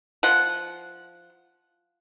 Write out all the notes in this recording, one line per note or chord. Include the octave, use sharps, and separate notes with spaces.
F3 F#5